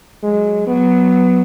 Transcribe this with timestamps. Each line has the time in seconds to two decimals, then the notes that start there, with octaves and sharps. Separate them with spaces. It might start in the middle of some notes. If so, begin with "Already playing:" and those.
0.23 F#3 G#3
0.67 F#3 B3